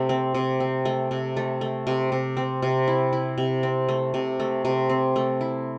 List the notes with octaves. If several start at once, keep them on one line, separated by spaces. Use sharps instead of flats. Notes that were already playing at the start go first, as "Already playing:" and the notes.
Already playing: C3 A3
C4
C3
C4
A3
C3
A3
A3
C3
C3
C4
C3
E4
E4
C3
C4
A3
C3
A3
C3
C4
A3
E4